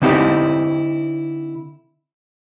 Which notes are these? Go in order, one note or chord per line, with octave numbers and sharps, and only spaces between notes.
D3 C4 D#4 E4 G4